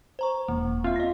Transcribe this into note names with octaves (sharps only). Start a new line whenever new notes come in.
C5 A#5 C#6
E1 A#3
C4 F4 E5
D#5 A#6